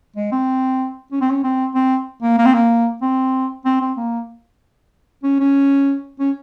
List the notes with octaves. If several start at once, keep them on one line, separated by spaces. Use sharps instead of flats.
G#3
C4
C#4
C4
C#4
C4
C4
A#3
A#3
C4
A#3
C4
C4
C4
A#3
C#4
C#4
C#4